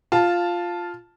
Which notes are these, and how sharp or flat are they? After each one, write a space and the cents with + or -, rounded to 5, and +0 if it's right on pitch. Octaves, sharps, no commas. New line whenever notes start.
F4 +0 A5 +0